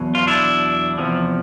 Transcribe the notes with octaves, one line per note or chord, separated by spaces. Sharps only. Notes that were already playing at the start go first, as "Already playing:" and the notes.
Already playing: E2 B2 F#3
F4
D4 E4
E2 C3 F3